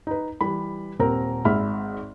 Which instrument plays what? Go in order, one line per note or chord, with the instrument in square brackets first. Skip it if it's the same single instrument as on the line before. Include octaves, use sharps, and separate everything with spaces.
[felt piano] D#4 B4
E3 G3 B5
D#1 C4 A#4 A#5
G#1 G#2 E5 B5 F6